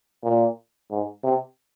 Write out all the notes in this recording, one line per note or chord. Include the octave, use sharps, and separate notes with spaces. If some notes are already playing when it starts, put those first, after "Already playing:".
A#2
G#2
C3